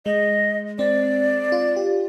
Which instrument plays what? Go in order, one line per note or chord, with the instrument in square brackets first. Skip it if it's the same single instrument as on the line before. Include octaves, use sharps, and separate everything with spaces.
[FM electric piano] G#3 [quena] D#5
[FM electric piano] C4 [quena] D5
[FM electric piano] F4
G4